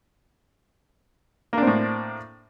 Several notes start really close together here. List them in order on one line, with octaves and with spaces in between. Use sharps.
A#3 D4 C4 A2